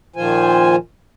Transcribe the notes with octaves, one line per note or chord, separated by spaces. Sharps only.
A#2 D#3 F3 F4 C5 G#5